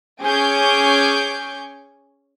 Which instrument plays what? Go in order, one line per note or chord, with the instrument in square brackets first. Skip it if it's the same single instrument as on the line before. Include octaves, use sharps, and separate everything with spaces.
[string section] C#4 G#4 G#5 C#6 D6 G6